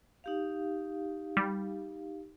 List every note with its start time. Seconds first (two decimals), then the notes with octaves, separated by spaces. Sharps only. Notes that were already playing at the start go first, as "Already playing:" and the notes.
0.24 D#4 G4 F5
1.37 G3